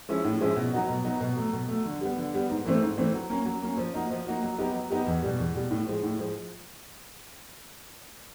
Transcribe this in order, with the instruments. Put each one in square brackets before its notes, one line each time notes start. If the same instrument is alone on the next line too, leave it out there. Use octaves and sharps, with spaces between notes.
[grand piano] F3 G#3 C#4 E4
A2
F3 G#3 C#4 E4
B2
F#3 B3 D#4 F#4
B2
F#3 B3 D#4 F#4
B2
F#3 A3
B2
F#3 A3
D3
G3 B3
D3
G3 B3
G#2
E3 A3 C4
G#2
E3 A3 C4
F#3
A#3 C#4
F#3
A#3 C#4
F3
A#3 D#4 F#4
F3
A#3 D#4 F#4
F#3
B3 D#4 G4
F#3
B3 D#4 G4
E2
B2 G3
E2
B2 G3
A2
F3 G#3
A2
F3 G#3